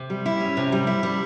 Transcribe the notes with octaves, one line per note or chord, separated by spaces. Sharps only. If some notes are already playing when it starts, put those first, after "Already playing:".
Already playing: C3
G3
E4
C#4
C3
G3
E4
G3